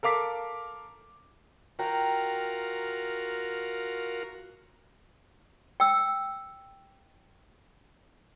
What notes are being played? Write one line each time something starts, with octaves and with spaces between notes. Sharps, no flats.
A4 A#4 F5 D6 B6
F4 F#4 A#4 G5 A#5
G5 E6